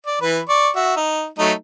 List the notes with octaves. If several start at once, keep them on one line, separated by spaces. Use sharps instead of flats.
D5
E3 B4 B5
D5 C#6
F#4 E5
D#4
F#3 A3 D#4